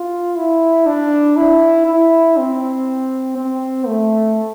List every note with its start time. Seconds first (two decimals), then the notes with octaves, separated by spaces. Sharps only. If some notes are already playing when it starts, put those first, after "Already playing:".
Already playing: F4
0.37 E4
0.86 D4
1.37 E4
1.87 E4
2.37 C4
3.37 C4
3.87 A3